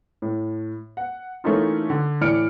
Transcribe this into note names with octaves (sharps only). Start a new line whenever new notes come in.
A2
F#5
E3 A3 A#3 C#4 D#4 F4
D3
A2 E3 D5 F6 C#7 D7